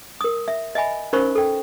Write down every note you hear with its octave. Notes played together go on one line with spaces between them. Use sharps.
A#4 D#6
E5
D#5 E5 G#5 B5
C#4 D#4 A#4 C5 B5 C#6
A4 G5